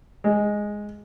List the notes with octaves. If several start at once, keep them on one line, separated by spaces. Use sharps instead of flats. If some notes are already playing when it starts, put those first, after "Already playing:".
G#3